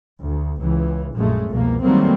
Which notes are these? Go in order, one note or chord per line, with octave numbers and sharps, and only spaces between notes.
D2
C#2 E3
A#1 F#2 A#2 G#3 A3
C2 F2 B2 A#3
D#3 F#3 G3 A3 A#3 C4